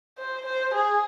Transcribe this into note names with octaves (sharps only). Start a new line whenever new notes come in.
C5
C5
G#4